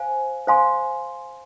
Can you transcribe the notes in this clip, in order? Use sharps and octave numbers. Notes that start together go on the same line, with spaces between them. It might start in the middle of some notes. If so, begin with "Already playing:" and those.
Already playing: C5 F5 G#5
C5 F5 G#5 C6